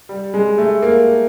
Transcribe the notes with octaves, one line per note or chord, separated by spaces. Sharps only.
G3
G#3
A3
A#3